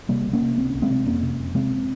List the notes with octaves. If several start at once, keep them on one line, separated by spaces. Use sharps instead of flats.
C3 G3 A#3
C2
A#3 C#4
C3
C2 C4
C2 C#4
G#3 C4
C3
F2 A#3 C#4
C3
F2
C3 G#3 C4